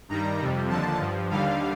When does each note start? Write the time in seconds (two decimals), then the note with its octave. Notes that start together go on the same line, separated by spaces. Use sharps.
0.09 G2 D#3 G3 A#5
0.39 F2 C3 G3
0.69 D#2 D3 F3 A5
1.00 G2 F3
1.30 D#2 D3 G3 F5